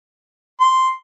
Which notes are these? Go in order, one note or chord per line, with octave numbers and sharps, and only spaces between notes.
C6